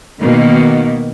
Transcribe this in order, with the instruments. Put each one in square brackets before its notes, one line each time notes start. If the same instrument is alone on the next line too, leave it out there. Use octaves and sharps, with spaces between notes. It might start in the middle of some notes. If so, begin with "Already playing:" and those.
[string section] B2 D#3 A#3